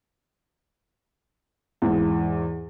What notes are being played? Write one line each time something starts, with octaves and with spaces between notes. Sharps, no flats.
E2 G#2